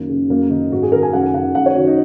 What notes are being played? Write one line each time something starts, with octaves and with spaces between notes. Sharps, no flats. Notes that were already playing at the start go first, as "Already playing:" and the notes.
Already playing: F#2 D#3 A#3
C#3
F#2 A#3
D#3 D#4
G#2 F#4
G#4
D#3 A#4
G#5
F#2 F#5
D#3 F#5
F#2 F#5
C#5
D#3 F#4
D#4